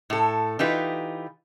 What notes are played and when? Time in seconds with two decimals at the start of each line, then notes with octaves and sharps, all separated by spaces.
0.10 A2 A4
0.59 E3 D#4 F4 G4 B4